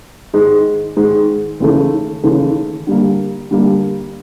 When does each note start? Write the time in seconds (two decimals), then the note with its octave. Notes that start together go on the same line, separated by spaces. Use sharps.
0.33 G#2 D#3 G#3
0.96 G#2 D#3 G#3
1.60 D#2 C#3 E3 A3
2.23 D#2 C#3 E3 A3
2.87 D3 G3 A#3
3.51 D3 G3 A#3